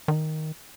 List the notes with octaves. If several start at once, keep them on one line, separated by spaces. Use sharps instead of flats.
D#3